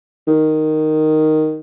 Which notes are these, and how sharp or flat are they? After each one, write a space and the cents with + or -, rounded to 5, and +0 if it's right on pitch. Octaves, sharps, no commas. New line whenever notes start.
D#3 -5